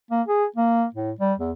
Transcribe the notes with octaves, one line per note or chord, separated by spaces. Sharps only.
A#3
G#4
A#3
A2
G3
E2